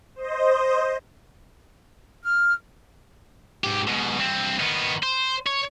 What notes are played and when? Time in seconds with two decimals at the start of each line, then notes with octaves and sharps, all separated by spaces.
0.15 C5 D#5
2.23 F6
3.64 G#2 G4
3.88 G#2 B2
4.18 G2 C4
4.60 D#3 B3
5.03 C5
5.46 C#5